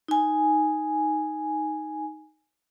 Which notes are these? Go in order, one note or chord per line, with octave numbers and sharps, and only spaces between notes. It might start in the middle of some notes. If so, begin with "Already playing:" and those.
D#4 G#5